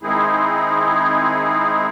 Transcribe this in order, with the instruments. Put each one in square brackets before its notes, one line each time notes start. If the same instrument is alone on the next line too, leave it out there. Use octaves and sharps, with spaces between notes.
[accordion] D#3 G#3 C4 D#4 E4 G#4